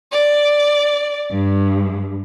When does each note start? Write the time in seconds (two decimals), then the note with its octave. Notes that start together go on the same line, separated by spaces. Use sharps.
0.11 D5
1.30 G2